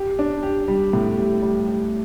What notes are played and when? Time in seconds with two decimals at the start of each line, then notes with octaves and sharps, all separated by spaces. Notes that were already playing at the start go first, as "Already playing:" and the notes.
Already playing: G4
0.19 D4
0.43 G4
0.68 G3
0.93 A2
1.17 G4
1.42 G3
1.67 G4